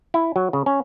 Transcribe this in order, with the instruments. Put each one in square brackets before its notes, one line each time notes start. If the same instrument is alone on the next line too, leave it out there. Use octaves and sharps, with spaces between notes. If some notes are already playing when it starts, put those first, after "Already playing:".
[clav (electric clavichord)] E4
F#3
C#3
C#4